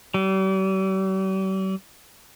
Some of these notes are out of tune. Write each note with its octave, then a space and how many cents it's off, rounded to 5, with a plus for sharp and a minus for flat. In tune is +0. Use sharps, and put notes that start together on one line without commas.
G3 -45